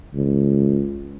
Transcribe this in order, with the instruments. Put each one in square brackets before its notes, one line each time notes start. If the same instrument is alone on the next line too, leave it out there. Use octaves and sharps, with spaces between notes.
[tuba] C#2